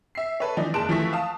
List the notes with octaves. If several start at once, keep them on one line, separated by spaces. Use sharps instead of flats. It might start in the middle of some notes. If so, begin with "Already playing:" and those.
E5 C7
A4 B4 C#5
E3 F3 D4 D#4
F#1 G#3 A5 F#6 D7 E7
E3 F3 A3 E4 C#6 B6
F5 A5 D#6